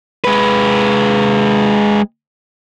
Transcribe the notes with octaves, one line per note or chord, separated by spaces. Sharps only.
G#3 B4